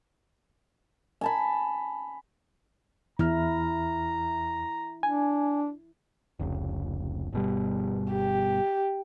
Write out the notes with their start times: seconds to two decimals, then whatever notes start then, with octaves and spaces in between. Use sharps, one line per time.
1.21 G#5 A5 B5
3.19 E2 E4 A#5 F6
5.03 D4 G#5
6.39 F1 C#2
7.33 G1 B2 G3
8.13 G4